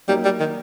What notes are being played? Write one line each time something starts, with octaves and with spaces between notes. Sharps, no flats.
F#3 G3 A#3 D#4 G4
G3
D#3